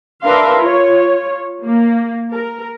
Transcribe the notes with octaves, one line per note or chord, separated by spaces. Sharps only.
D4 A#4 B4 E5 F5 C6
F4 C#5
A#3
A#4